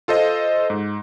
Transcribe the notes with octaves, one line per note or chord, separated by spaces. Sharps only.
F4 A4 C5 D#5
G#2